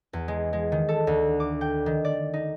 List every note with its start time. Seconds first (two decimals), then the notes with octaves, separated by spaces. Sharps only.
0.13 E2
0.28 G#3
0.53 G#3
0.72 D#3
0.89 A4
1.07 D2
1.40 D6
1.61 G5
1.86 D#3
2.05 D5
2.34 D#4